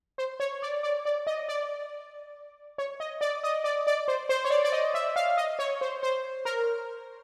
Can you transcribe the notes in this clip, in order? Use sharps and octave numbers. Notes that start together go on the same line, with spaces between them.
C5
C#5
D5
D5
D5
D#5
D5
C#5
D#5
D5
D#5
D5
D5
C5
C5
C#5
D5
D5
D#5
E5
F5
D#5
C#5
C5
C5
A#4